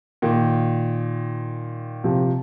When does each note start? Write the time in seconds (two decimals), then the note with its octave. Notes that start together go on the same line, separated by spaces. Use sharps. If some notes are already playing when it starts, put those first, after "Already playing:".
0.22 A#2 D#3
2.04 C3 F3